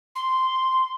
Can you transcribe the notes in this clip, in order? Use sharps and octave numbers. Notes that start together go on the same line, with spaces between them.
C6